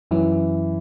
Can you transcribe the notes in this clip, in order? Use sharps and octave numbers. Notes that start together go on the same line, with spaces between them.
F#2 E3 F#3 C#4